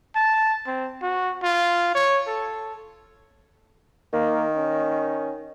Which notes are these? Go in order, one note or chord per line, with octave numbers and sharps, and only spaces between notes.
A5
C4
F#4
F4
C#5
A4
D#3 A#3
C#4